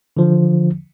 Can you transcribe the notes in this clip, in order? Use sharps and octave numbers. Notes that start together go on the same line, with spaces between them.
D3 F3